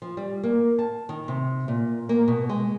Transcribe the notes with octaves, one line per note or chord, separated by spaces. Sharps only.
F3
G3
A#3
A5
D#3
C3
A#2
A#3
B2
G#3